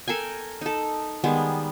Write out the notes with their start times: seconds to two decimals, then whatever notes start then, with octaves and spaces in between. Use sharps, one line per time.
0.08 A4 A#4 G5 G#5
0.61 D#4 A4
1.24 D#3 G3 G#3 B3